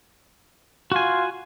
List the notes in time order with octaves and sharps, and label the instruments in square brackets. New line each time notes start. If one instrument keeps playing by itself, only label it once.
[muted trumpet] F4 [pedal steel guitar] F#4 G#5